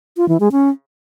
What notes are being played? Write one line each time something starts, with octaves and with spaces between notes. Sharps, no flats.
F4
E3
G#3
C#4